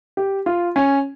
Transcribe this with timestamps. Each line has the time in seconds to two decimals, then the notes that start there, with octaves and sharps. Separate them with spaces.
0.17 G4
0.46 F4
0.76 C#4